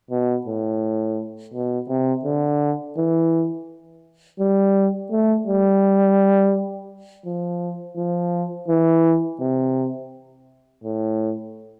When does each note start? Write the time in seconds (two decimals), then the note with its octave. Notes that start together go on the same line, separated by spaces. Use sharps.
0.11 B2
0.47 A2
1.54 B2
1.89 C3
2.25 D3
2.97 E3
4.40 G3
5.11 A3
5.47 G3
7.26 F3
7.97 F3
8.68 E3
9.40 C3
10.84 A2